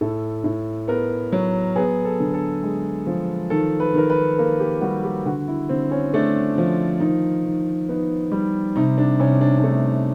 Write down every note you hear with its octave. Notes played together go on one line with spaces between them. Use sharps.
A2 A4
A2
B3 A#4
F#3
B3 G#4
A4
D3
A4
G#3
F3
D#3 A4
B4
D#3 A#4
B4
A#3 A#4
G4
G3 F#4
G4
D3 F#4
E4
D3 C4
C#4
A3 D4
F3
D#3 D#4
D#3
B3 D#4
G3
C3 D#4
D4
C3 C#4
D4
D4
A3 D#4